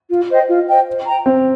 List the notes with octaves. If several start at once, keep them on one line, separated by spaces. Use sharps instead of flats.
F4
C5 D#5 G5
F4
C5 D#5 G5
C5
G5 A#5
C4 C5